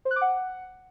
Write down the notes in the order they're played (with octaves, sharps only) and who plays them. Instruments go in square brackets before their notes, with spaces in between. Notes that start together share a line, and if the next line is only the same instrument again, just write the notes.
[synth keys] C5
F#6
D6
F#5